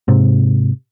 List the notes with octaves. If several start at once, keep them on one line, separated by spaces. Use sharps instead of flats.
G#2 C3